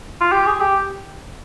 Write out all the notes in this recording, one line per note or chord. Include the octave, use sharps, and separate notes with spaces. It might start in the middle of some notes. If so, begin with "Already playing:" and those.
F4
G4
G#4
G4